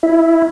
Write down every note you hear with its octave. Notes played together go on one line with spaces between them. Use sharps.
E4